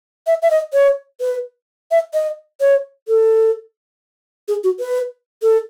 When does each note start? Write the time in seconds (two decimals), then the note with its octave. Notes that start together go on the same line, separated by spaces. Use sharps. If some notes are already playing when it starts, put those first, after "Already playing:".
0.27 E5
0.42 E5
0.51 D#5
0.74 C#5
1.21 B4
1.91 E5
2.14 D#5
2.61 C#5
3.08 A4
4.48 G#4
4.64 F#4
4.79 B4
5.42 A4